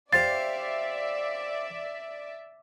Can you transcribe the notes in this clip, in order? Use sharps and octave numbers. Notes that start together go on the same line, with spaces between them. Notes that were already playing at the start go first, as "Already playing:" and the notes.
G4 C5 D5 E5 F5 A6